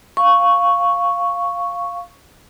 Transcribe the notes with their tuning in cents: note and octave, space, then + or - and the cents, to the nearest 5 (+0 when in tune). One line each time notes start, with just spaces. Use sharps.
F5 +0 C#6 +0